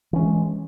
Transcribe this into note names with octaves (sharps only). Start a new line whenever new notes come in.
E3 G#3 C#4